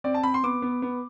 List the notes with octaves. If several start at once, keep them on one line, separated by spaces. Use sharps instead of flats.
C4 D5
A5
C4 B5
C6
B3 D6
B3
B3